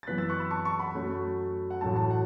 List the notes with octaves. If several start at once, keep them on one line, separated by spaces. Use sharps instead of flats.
A6
F#2 E3 B3 F#6 B6
E6 A6
C#6 F#6
B5 E6
A5 C#6
A5 C#6
F#5 B5
F#2 F#3 A3 C#4
F#5
A1 A2 F#3 A3 A5
A5
F#5